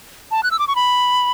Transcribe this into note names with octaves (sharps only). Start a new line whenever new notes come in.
A5
F#6
E6
D6
C#6
B5